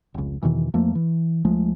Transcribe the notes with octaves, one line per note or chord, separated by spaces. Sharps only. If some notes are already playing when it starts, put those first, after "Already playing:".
F1 C#2
E2 B2 D#3 E3
F2 F3 A3 A#3
E3
C#2 F3 G#3 A3